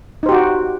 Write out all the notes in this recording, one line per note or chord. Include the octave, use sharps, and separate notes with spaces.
D#4 F#4 G4 C5